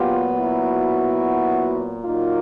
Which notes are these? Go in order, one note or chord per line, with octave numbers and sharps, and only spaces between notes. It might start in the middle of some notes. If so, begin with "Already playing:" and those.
Already playing: A#2 F#3 B3 F4 G4
E4 F#4
A#2 F#3 A#3 D#4 F4